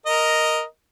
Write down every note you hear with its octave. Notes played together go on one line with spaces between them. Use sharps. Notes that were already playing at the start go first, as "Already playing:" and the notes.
A#4 D#5